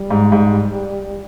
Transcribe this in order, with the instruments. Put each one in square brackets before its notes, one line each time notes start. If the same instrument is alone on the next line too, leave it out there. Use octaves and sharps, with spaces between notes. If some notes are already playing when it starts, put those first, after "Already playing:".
Already playing: [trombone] G3
[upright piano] G#2
G#2